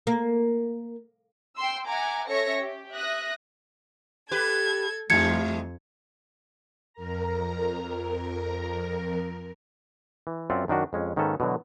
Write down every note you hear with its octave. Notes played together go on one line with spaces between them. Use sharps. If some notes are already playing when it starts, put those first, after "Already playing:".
A#3
G5 C6 E6
E5 F#5 G#5 A#5 D6
C#4 A4 C#5 E5 A#6 C#7
G4
E5 D#6 F#6 A#6
G4 A4 B4 G#6
F2 E3 G3 A3 D#4 G#6 C#7
F2 A#4 A#5
E3
F#2 C4 F4 D5 E5 F#5
F#2 D#3 D4 F#4
F2 G#3 C#4
G#2 D#3 A#3 C#4 A4 B4
B2 D3 E3 F#3